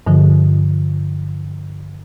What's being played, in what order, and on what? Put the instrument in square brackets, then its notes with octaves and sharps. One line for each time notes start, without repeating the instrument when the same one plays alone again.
[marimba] G2 D3 F3